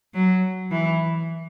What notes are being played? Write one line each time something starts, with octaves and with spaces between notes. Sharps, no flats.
F#3
E3